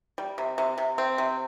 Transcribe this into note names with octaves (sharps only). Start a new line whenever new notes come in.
G3
C3
C3
C3
C4
C3